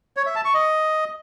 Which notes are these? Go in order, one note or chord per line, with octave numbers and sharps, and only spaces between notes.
C#5
E5
A5
C#6
D#5